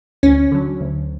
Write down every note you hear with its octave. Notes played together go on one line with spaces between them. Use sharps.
D2 C#4
D3 F#3
D2